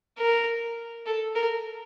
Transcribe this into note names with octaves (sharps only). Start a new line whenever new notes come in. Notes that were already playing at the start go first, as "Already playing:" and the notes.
A#4
A4
A#4